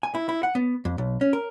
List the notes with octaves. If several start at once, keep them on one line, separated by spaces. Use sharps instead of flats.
G#5
E4
E4
F#5
B3
F2
B1
C#4
A#4